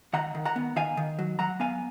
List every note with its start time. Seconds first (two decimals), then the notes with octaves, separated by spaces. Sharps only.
0.13 D#3 F#5 A#5
0.35 D#3
0.45 F#5 A#5
0.56 B3
0.76 D#3 F5 G#5
0.97 D#3
1.19 F#3
1.39 F#3 F#5 A#5
1.60 B3 F5 G#5